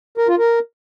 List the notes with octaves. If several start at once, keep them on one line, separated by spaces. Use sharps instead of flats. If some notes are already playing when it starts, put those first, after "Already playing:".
A#4
F4
A#4